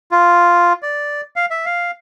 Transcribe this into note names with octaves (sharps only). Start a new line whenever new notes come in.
F4
D5
F5
E5
F5